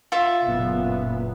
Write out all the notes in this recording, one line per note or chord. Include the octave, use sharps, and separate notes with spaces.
F4 E5
F#1 A#2 B3